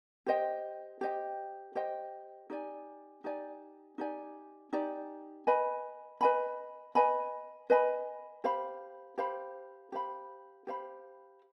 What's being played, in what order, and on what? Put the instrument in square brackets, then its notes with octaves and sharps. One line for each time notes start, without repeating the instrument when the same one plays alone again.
[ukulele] G4 C5 D#5 G5
G4 C5 D#5 G5
G4 C5 D#5 G5
D#4 G4 D5 G#5
D#4 G4 D5 G#5
D#4 G4 D5 G#5
D#4 G4 D5 G#5
B4 D#5 G#5 B5
B4 D#5 G#5 B5
B4 D#5 G#5 B5
B4 D#5 G#5 B5
G4 C5 F5 B5
G4 C5 F5 B5
G4 C5 F5 B5
G4 C5 F5 B5